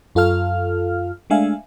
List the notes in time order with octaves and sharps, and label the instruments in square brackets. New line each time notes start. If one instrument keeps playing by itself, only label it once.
[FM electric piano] F#2 F4 A4 F5 F6
G#3 A3 D4 E5 F5 G#5